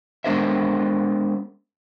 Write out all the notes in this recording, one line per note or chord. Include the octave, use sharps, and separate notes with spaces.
G#3 B3 D4 A#4 C5 E5